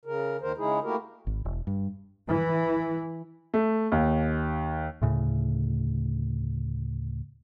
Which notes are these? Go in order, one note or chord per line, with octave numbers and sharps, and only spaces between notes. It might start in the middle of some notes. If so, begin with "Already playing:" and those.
C#3 A#4
D#2 D#3 A#4 C5
C#3 G#3 D#4 E4 G#4
A3 A#3 E4 F#4 G4 A#4
G#1
E1
G2
E3
A3
D#2
D2 A2 C#3